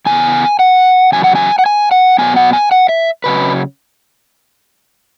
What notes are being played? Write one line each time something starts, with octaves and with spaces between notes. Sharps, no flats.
C#3 E3 B3 G#5
F#5
E2 C#3 F#3 G#5
F#5
G#5
F#5
G#5
F#5
B2 F#3 B3 G#5
F#5
G#5
F#5
E5
C#3 F#3 C#4 B4